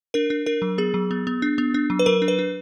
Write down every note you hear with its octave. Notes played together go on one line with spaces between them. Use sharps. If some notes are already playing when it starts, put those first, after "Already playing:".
D4 A#4
D4
D4 A#4
F#3
B3 G#4
F#3
B3
B3
D4
B3
D4
F#3
B4
F#3 A#4
D4
B4
D4